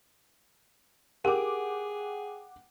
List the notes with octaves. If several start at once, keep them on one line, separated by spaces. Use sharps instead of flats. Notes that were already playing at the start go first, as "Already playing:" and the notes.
G4 G#4 A#4 F#5 G5 D6